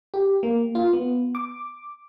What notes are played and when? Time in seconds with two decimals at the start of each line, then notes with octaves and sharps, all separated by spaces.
0.14 G4
0.43 A#3
0.75 F4
0.93 B3
1.35 D6